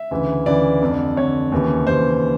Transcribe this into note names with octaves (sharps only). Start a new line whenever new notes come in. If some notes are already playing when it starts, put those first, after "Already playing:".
Already playing: E5
D2 C#3 E3
D2 C#3 E3 D5
F2 D3
F2 D3 C#5
D#2 C#3 E3
D#2 C#3 E3 C5